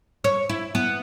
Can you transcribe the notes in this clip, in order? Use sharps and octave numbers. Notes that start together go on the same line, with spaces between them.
C#5
E4
B3